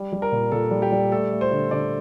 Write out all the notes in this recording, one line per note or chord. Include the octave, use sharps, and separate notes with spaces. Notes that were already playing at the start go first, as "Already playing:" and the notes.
Already playing: G3
G3
A#4
A#2
A#2 A4
G3
G4
G3
A3 A4
A3
C5
D3
D3 D5